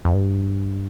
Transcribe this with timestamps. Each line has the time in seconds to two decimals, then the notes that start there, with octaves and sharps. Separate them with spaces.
0.05 F2
0.14 G2